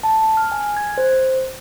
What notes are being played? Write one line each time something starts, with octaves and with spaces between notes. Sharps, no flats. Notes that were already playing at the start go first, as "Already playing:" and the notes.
A5
F6
G#5
G#6
C5